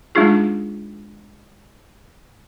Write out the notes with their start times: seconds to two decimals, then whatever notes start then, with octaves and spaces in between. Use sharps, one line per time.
0.15 G#3 A3 D4 D#4 F4 G#4